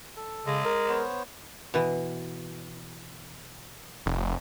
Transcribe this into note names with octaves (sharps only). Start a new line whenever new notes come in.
A4
C#3 G#3
A#4
B3 C5 C#5
B2 E3
F1